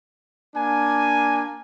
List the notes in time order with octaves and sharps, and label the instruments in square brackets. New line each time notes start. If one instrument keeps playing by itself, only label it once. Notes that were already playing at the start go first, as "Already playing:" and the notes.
[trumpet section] A#3 D4 G#5